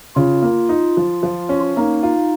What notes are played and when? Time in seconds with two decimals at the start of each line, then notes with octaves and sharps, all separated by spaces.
0.16 C#3 F4
0.43 A#3
0.69 D#4
0.97 F3
1.23 F3
1.49 C#4
1.77 A#3 D#4
2.03 F4